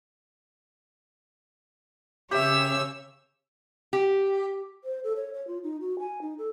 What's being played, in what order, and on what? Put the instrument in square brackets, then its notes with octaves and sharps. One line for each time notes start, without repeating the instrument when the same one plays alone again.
[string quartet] C#3 C#5 E6 [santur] G4 E5
[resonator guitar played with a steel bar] G4
[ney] C5
A4
C#5
C#5
F4
D#4
F#4
G#5
D#4
A4